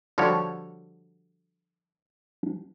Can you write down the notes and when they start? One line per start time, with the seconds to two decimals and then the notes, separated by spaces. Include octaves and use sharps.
0.18 D3 F3 G3 F#4 C#5